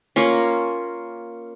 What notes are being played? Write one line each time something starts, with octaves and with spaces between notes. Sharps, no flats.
A#3 C#4 F4